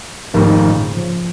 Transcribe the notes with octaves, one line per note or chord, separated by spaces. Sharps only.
F1 F2 G#2 C3 D#3 A#3
A#2 C#3
C#3 F3